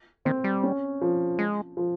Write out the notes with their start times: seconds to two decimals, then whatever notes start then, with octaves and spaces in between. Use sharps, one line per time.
0.25 D#3 C4
0.44 G3
0.63 C#4
1.01 F3
1.39 G#3
1.77 F3